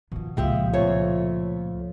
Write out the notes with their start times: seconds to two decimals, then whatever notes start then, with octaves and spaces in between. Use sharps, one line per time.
0.12 B2 D#3 F3
0.37 C#2 A#2 F3 G#3 G4 E5
0.73 F2 A3 C#5